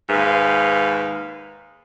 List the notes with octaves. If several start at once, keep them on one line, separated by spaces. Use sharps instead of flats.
D#2 G#2 B4 F5